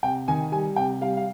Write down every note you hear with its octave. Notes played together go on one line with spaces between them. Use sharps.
C3 G5
D#3 G#5
G3 G#5
C3 G5
G3 F5
F5